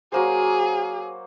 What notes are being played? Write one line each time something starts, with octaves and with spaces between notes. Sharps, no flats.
F#3 A#3 G#4 C5